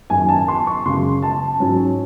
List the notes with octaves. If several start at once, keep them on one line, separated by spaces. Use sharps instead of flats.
F#2 D#3 F#3 G#5
A5
C6
C#6
F#2 C#3 G#3 C6
A5
G#2 F#3 C#4